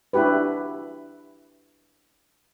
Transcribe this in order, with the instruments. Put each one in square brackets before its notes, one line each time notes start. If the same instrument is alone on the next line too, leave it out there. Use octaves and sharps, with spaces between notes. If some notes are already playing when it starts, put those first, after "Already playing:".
[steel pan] D4 E4 F#4 G4 B4